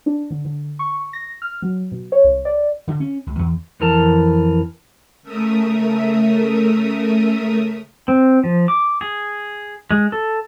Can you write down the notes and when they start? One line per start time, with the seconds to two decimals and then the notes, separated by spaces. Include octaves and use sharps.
0.06 D4
0.31 D3
0.45 D3
0.79 C#6
1.13 A#6
1.42 F6
1.62 F#3
1.92 B2
2.12 C#5
2.24 C2
2.45 D5
2.88 D3
3.00 C#4
3.27 C#2
3.39 E2
3.80 F2 E3 A#4 A5
5.22 C#3 A3 A#4 E5 D#6
8.08 C4
8.44 F3
8.68 D6
9.01 G#4
9.91 G#3
10.12 A4